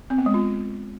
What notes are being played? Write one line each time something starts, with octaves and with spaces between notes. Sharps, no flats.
C4
B3
G#3
F4